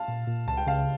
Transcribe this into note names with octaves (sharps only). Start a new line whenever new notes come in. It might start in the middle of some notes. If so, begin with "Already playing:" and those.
Already playing: F5 A5
A#2
A#2
C#2 A5
G5
C#3 F5 A5